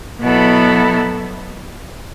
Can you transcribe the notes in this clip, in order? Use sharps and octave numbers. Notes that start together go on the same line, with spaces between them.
B2 F#3 B3 E4 A4